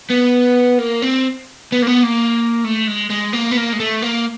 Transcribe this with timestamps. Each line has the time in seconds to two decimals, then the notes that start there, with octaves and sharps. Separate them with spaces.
0.10 B3
0.79 A#3
1.02 C4
1.72 B3
1.82 A#3
1.87 B3
2.03 A#3
2.64 A3
2.88 G#3
3.10 G#3
3.33 A#3
3.51 B3
3.57 A#3
3.73 G#3
3.80 A3
4.02 A#3